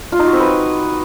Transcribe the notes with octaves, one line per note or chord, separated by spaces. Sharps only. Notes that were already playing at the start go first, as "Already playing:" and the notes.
F4
D#4
F#4
C4
B4